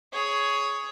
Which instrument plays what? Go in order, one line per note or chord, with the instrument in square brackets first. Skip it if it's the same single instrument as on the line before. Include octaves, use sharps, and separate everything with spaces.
[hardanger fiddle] G#4 C#5